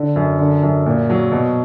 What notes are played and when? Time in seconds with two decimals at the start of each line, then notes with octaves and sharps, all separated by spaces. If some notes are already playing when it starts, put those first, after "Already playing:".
Already playing: D3
0.16 F#2
0.39 D3
0.63 F#2
0.86 A#2
1.10 F#3
1.32 B2